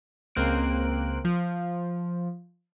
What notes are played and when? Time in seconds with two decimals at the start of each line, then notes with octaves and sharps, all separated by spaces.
0.35 C#2 A#3 C4 F#6 D7
1.25 F3